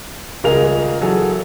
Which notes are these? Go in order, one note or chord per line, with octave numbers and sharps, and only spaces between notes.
D#1 C#2 G#4 A#4 F5 F7
E3 F#3 G#4 A4